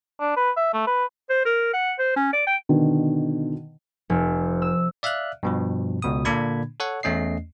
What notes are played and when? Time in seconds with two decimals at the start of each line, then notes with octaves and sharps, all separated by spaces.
0.20 D4
0.37 B4
0.56 E5
0.74 A3
0.87 B4
1.29 C5
1.46 A#4
1.73 F#5
1.99 C5
2.16 C#4
2.33 D5
2.47 G5
2.69 B2 D3 D#3
4.10 F1
4.62 E6
5.03 D5 E5 F5 F6 F#6
5.43 G2 B2 F3
6.02 C#2 B2 D#6
6.25 A#2 D3 A#3 D4 B5 G#6
6.80 A4 C#5 F#5
7.03 E2 A3 C#4 D#5 C7